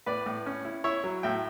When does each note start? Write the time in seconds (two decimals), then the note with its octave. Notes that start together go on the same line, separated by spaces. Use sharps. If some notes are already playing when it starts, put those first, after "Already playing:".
0.06 A2 B4 D5
0.26 A2
0.46 C#4
0.65 E4
0.84 E4 C#5 E5
1.04 F#3
1.23 A2 E5 G5